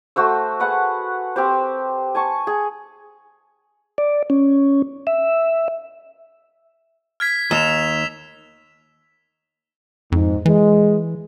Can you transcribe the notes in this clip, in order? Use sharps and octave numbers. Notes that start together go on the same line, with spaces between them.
A3 F#4 C5 E6
G#4 B4 F#5 A5
C4 G4 C5
G#5 A5 C#6
G#4
D5
C#4
E5
F6 G#6 B6
D#2 E6 E7 F7
F2 G#2
E3 G#3